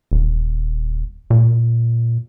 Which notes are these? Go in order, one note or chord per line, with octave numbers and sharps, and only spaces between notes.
D#1
A#2